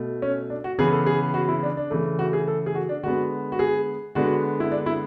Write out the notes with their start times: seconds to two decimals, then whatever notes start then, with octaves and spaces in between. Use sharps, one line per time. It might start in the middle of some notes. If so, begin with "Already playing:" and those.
Already playing: B2 A3
0.22 C#4
0.50 D4
0.64 F#4
0.78 C#3 E3 B3 G#4
0.92 A4
1.06 G#4
1.34 F#4
1.48 E4
1.63 D4
1.77 D4
1.90 C#3 E3 A3
2.19 F#4
2.33 G#4
2.48 A4
2.66 G#4
2.75 F#4
2.89 D4
3.03 D3 G#3 B3 F#4
3.52 F#4
3.59 G#4
4.15 D3 G#3 B3 F#4
4.60 E4
4.72 D4
4.86 E4